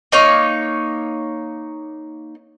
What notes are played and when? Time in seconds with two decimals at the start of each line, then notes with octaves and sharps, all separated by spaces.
0.12 A#3 D#4 C#5